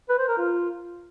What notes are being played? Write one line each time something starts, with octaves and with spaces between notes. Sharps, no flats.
B4
C5
A#4
F4